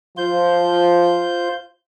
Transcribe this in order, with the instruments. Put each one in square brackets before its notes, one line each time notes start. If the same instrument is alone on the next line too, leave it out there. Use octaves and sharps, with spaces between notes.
[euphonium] F3 [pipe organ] F4 C5 G6